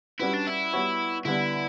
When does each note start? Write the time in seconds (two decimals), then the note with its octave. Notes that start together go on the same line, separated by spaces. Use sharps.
0.20 G3 C#4 E4 F#4 B4
0.33 D4
0.47 E4
0.73 G3 B3 F#4 C#5
1.25 D3 G3 B3 D4 E4